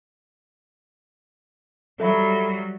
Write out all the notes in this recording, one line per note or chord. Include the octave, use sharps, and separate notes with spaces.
F#3 G3 A4 E5 B5